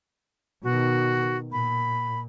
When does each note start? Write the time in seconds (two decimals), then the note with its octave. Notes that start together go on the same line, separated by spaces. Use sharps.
0.63 B2 D#3 F#4
1.52 A#2 B5